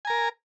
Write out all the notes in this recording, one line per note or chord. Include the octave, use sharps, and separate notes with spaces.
A#4 G#5 A#5